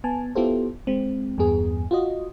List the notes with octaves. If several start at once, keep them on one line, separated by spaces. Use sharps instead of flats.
B3 G#5 A5
B3 E4 F4 G4 A4 C5
G#3 C4
E2 G2 B3 G#4
F4 F#4 D#5